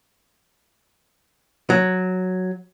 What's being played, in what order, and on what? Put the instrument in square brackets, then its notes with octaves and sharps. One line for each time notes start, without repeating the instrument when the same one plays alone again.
[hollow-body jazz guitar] F#3